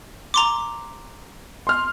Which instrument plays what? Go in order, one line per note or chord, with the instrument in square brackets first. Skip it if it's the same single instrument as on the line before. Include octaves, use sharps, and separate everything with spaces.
[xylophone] A#5 C6 D6
[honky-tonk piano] C6 F6